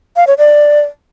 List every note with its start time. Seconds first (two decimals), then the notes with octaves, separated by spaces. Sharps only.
0.16 F5
0.27 C#5
0.38 D5